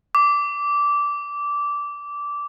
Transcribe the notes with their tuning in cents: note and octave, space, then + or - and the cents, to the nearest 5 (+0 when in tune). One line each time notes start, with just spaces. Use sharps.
D6 -15